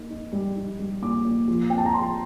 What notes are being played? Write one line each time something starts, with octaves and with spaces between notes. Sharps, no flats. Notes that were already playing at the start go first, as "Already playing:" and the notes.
Already playing: A#3 D#4
D#4
G3
D#4
G3
A#2 D6
A#2
F3
C4 G5
A5
A#5
F3 C6